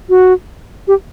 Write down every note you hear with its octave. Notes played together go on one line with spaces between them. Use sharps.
F#4
G4